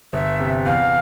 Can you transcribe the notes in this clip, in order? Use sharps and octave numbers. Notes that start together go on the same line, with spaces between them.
G1 E5
C3
E2 F5